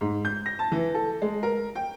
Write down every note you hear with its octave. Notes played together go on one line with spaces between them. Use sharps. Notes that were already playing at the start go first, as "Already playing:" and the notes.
G#2
G6
A#6
A5
E3
A4
G#3
A#4
G5